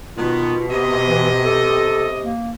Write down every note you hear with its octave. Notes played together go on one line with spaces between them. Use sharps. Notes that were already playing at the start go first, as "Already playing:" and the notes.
B2 D#3 B3 F4
C3 G4 D#5
E3
A4
A#3